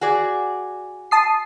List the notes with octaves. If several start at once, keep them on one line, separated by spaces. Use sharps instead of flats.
F#4 G#4 D5
A5 D#6 C7